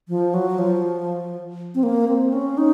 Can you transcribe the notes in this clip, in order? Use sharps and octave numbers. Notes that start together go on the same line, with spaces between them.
F3
F#3
F3
C4
A#3
C4
C#4
D#4